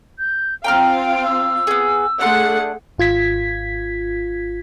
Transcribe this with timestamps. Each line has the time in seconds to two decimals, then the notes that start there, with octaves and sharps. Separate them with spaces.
0.18 G6
0.64 C4 F4 F5 G5 A#5 F6 D7
1.24 E6
1.67 B3 G#4
2.21 A3 D4 G#4 F#5 C6
2.98 G#1 F4 G#6 B6